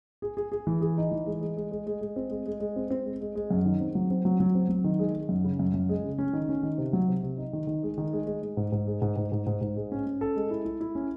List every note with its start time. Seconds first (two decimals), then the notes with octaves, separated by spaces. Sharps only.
0.22 G#4
0.37 G#4
0.52 G#4
0.67 E3
0.81 G#4
0.97 D#4
1.11 E3
1.26 G#3
1.41 G#3
1.57 G#3
1.71 G#3
1.87 G#3
2.01 G#3
2.16 C4
2.30 G#3
2.46 G#3
2.60 G#3
2.76 C4
2.90 C4
3.05 G#3
3.21 G#3
3.35 G#3
3.51 F#2
3.65 D#3
3.80 C4
3.95 F#3
4.10 C4
4.25 F#3
4.40 F#3
4.55 C4
4.69 F#3
4.84 D#3
4.99 G#3
5.14 G#3
5.29 F#2
5.44 C#3
5.59 F#2
5.74 F#2
5.89 G#3
6.04 C#3
6.18 C#4
6.33 D#3
6.49 C#4
6.63 D#3
6.78 C3
6.93 F#3
7.08 C3
7.23 C3
7.38 D#4
7.53 D#3
7.67 D#3
7.83 G#3
7.98 D#3
8.13 G#3
8.27 G#3
8.42 G#3
8.57 G#2
8.72 G#2
8.87 G#3
9.02 G#2
9.16 G#2
9.32 G#2
9.46 G#2
9.61 G#2
9.76 G#3
9.92 C#4
10.06 C#4
10.21 A4
10.36 G#3
10.50 E4
10.65 E4
10.81 E4
10.95 C#4